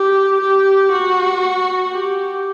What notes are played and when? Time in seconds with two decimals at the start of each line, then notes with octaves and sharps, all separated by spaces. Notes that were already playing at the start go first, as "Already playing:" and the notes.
Already playing: G4
0.40 G4
0.91 F#4
1.93 G4